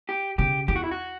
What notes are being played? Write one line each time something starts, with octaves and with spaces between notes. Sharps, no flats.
G4
C#3 G4
E2 G4
F#4
E4
F#4